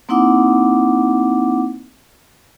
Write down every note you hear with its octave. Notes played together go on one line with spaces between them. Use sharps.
A#3 C4 D#4 E4 F#5 D6